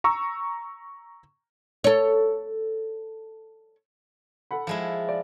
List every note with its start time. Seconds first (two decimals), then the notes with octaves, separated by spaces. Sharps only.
0.04 A#5 C#6 E6
1.84 A4 C#5
4.51 A4 F#5 B5
4.67 F3 G#3 E4
5.09 D5